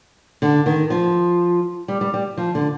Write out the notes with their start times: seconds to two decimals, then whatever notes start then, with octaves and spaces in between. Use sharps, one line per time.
0.42 D3
0.66 D#3
0.90 F3
1.88 G3
2.01 G3
2.14 G3
2.37 F3
2.55 D3